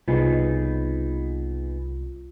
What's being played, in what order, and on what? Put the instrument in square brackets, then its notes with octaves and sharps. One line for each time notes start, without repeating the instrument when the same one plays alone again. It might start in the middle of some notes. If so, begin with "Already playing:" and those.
[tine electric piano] C2 [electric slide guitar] B3 D#4 G#4 [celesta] F4